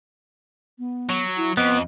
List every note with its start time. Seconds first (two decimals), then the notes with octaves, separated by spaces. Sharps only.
0.79 B3
1.09 F#3
1.37 E4
1.57 F2 B3 D#5